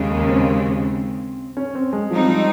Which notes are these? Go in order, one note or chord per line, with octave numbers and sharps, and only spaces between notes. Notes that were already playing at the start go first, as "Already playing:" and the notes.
Already playing: D#2 C#3 G#3
A#3
C4
C#4
C4
G#3
F3 G3 C4 D#4
F3